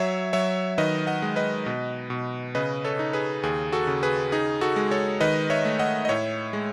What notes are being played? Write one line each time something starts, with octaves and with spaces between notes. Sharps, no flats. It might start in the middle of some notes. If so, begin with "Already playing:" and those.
Already playing: F#3 C#5 E5
F#3 C#5 E5
D#3 B4 D#5
D#5 F#5
G#3
B4 D#5
B2
B2
C#3 B4 D#5
A4 C#5
D#4
G#4 B4
D#2 G#4
F#4 A4
C#3
G#4 B4
D#4 G#4
F#4 A4
G#3
A4 C#5
D#3 B4 D#5
C#5 E5
A3
D#5 F#5
D#5
A2 C#5 E5
G#3